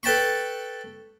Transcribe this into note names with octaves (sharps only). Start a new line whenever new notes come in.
A4 B4 G5 A5 B5 C#6